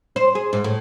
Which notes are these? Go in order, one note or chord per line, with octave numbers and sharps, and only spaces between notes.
C5
G#4
G#2
A2